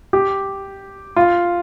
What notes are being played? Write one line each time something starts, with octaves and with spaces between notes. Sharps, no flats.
G4
F4